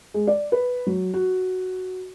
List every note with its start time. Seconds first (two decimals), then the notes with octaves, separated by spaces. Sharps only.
0.14 G#3
0.27 D5
0.52 B4
0.87 F#3
1.14 F#4